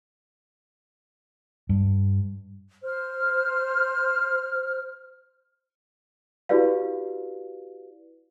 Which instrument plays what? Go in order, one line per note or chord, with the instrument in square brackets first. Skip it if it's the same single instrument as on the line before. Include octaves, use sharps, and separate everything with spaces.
[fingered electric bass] G2
[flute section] C5 F6
[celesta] E4 F#4 G4 B4 D5 F5